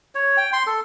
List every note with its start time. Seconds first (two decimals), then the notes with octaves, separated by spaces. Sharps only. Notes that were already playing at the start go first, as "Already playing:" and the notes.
0.15 C#5
0.37 G5
0.53 C6
0.67 A4